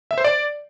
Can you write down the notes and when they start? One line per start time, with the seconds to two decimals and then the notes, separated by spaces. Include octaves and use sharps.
0.11 E5
0.18 C5
0.24 D5